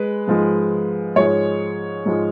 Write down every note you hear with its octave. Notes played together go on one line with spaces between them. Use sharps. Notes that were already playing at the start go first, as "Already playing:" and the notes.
Already playing: G#3 B4
G#2 F3 G#3
G#2 F3 G#3 C#5
G#2 F3 G#3